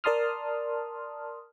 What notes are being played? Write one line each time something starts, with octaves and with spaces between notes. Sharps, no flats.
A#4 D5 A5 C6 D#6 F6